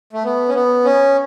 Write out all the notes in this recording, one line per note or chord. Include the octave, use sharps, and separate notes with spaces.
A3
B3
C#4
B3
C#4